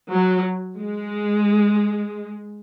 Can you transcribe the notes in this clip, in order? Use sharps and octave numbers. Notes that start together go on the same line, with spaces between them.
F#3
G#3